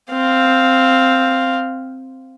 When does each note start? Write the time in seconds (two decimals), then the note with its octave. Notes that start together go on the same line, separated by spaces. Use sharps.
0.12 C4 F5